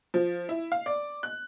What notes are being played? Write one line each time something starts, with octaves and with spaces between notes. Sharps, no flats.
F3
E4
F5
D5
F#6